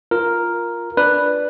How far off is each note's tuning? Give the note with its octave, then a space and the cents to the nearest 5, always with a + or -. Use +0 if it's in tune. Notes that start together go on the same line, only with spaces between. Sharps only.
F4 +0 A#4 +0
D4 +0 B4 +0 D5 +0